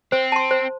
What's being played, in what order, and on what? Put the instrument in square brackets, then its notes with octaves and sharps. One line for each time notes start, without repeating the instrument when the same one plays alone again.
[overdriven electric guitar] C4 [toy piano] C5
[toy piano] A5 C6
C5